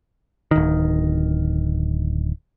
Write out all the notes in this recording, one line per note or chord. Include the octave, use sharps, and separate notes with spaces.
D1 D#3